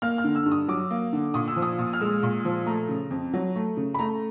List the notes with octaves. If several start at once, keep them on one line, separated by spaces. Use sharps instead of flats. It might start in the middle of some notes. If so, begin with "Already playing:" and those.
A#3 F6
F6
D3
E6
G2
D#6
F#3 D6
A#3
D3
A#2 D#6
E6
F3
D#6
A#2
F6
G#3 E6
A#2
F3
A3 A#5
C#3
F2
F#3
A3
C#3
B5
A3 A#5